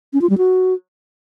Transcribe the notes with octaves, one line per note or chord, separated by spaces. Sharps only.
C#4
F4
G3
F#4